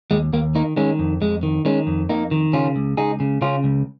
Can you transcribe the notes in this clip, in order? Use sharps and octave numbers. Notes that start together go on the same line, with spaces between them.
D#2 G#3
D#2 A#3
D#3 A#3 D#4
D#3 G#3 C#4
F2
F2 G#3
D#3
D#3 G#3 C#4
F2
F2 A#3 D#4
D#3
C#3 C#4 F4
C#2
C#2 D#4 G#4
C#3
C#3 C#4 F4
C#2